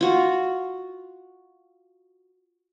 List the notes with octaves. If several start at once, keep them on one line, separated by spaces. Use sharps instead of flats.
F4 F#4